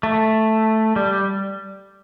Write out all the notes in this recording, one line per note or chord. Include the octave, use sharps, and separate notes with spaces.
A3
G3